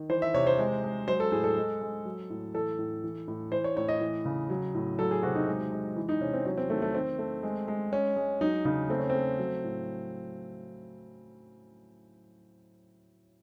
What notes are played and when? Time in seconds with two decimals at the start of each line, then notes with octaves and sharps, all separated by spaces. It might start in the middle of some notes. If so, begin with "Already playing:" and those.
Already playing: D#3
0.09 E3 C5
0.22 E5
0.34 C3 C#5
0.47 C5
0.59 G#3
0.84 G#3
1.07 F#3 C5
1.20 A4
1.32 A2 G#4
1.44 A4
1.57 G#3
1.81 G#3
2.05 F#3
2.30 A2
2.54 E3 A4
2.79 A2
3.04 E3
3.28 A2
3.51 E3 C5
3.64 C#5
3.77 A2 C#5
3.88 D#5
4.01 E3
4.25 C#3
4.50 F#3
4.75 A2
4.99 F#3 A4
5.11 G#4
5.23 C3 F#4
5.35 D#4
5.47 G#3
5.72 G#3
5.96 E3
6.09 D#4
6.21 C3 C#4
6.34 C4
6.45 F#3 C#4
6.57 C4
6.70 D#3 A3
6.82 A3
6.94 D#3 C4
7.19 A3
7.43 G#3
7.68 G#3
7.92 G#3 C#4
8.17 G#3
8.41 F#3 D#4
8.65 C#3 D#4
8.90 A3 C4
8.99 C#4
9.10 A3 C4
9.39 F#3
9.64 A2